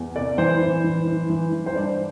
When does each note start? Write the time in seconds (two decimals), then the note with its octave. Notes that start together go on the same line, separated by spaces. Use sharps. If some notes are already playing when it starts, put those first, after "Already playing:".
Already playing: E2
0.15 C3 D5
0.38 E3 C5
0.61 E3
0.84 E3
1.07 E3
1.30 E3
1.52 E3
1.66 C5
1.76 G2 D5